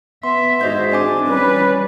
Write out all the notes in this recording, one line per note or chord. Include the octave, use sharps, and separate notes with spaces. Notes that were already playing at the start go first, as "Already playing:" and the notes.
B3 E5 C6
G#2 F#4 C5 D#5 G6
C4 D4 D5 G#5 D6
G3 C#4 B4